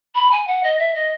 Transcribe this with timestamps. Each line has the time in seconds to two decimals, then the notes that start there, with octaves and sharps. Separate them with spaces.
0.15 B5
0.31 G#5
0.47 F#5
0.63 D#5
0.79 E5
0.94 D#5